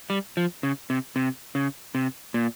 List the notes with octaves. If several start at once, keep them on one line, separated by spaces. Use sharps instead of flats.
G3
F3
C#3
C3
C3
C#3
C3
A#2